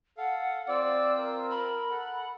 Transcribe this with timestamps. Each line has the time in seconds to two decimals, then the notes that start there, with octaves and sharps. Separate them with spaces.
0.18 A4 F5 F#5
0.69 C4 F4 C5 D5 E6
1.19 A#4
1.51 B5
1.90 A4 F#5